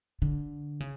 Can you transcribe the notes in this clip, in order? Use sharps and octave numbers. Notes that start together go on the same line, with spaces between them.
D3
C#3